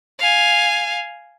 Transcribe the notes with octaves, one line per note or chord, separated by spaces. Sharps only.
F5 G#5